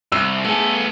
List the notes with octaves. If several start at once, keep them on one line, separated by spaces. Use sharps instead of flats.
C2 E6
A3 B3 G#4 A4